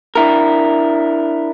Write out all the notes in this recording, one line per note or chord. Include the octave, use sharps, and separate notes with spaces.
D4 E4 A#4